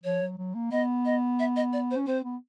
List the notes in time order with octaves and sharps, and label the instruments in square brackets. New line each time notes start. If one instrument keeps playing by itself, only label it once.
[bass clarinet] F3 [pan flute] C#5
[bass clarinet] F#3
F#3
A#3
[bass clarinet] B3 [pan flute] D#5
[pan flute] D#5
E5
D#5
D5
C5
[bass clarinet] C#4
[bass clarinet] C4 [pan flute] C5
[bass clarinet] B3